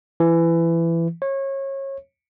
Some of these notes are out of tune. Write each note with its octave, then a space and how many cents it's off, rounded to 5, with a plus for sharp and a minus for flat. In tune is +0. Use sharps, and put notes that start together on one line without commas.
E3 +20
C#5 -25